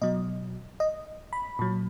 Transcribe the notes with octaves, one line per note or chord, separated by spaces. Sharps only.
B2 F#3 D#5
D#5
B5
A#2 F#3